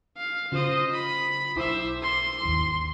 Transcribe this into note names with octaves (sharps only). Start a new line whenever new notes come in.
F5
C#3 F4 C5 D#5
B5
B1 E4 C5 E5 D6
C6
G#1 D#2